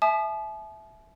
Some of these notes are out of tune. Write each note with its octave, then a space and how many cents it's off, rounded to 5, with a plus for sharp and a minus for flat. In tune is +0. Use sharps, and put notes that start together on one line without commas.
E5 +0 A5 -45 D#6 -35